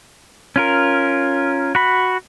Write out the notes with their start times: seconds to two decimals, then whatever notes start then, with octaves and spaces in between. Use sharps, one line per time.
0.56 C#4 F4 A#4
1.75 F#4 B5